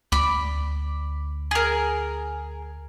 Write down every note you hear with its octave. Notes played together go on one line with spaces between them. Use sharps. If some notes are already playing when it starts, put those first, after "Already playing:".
D2 D5 B5
G#4 A#4